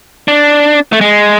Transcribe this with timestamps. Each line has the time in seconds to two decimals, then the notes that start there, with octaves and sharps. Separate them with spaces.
0.28 D4
0.93 A3
1.01 G#3